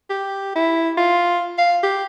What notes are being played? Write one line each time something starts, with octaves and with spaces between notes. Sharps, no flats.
G4
E4
F4
F5
G4